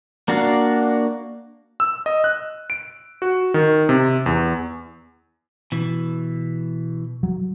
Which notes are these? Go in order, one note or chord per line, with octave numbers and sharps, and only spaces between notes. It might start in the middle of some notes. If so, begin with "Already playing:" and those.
A#3 D4 F#4 D5 F5
E6
D#5
F#6
D7
F#4
D#3
C3
E2
B2 E3
F#3